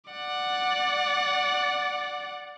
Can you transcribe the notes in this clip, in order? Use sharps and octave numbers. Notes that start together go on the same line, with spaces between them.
D5 F#5